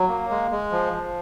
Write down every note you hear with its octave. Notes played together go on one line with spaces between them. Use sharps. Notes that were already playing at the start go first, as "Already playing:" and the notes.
Already playing: F#3
A#3
G#3
G#3
F3
F3